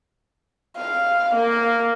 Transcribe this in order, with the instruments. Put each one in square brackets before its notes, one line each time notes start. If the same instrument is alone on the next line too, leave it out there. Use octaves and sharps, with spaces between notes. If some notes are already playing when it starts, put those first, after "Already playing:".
[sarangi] F5
A#3